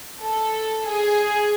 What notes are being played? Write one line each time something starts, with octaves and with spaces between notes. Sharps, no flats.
A4
G#4